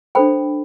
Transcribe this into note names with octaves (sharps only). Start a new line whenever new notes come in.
D4 A4 C5 G5 B5